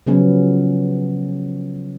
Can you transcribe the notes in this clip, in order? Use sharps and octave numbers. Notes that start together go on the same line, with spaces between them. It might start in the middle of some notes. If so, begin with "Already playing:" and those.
C#3 F3 F#3 B3 C#4